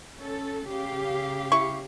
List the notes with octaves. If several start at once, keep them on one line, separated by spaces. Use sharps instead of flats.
C#4 A4
C#3 G4 F5
E4 C#6